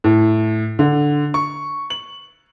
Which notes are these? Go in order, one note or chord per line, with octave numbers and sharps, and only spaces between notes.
A2
D3
C#6
F#7